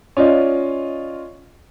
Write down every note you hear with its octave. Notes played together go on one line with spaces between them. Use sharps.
C#4 F4 D5 D#5